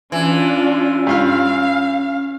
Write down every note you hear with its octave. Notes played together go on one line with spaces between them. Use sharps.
E3 C#4 D4 F4
G2 F4 F5 F6